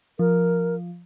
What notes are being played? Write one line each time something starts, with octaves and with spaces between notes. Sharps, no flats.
F3 A#4